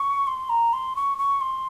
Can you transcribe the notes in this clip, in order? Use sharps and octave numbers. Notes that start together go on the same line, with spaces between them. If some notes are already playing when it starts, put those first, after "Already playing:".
Already playing: C#6
C6
A#5
C6
C#6
C#6
C6